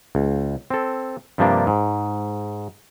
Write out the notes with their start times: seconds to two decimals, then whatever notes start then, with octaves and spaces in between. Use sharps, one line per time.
0.15 C#2
0.70 C4 A4
1.38 G2 C3 F3 G3 A#3 D4
1.67 G#2